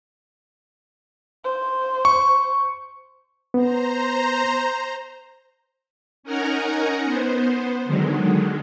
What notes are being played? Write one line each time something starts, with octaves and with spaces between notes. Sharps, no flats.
C5
C#6
B3 C5 A#5
C#4 D#4 A#4 F#5 G#5 A#5
B3 C5
D3 D#3 F#3 G#3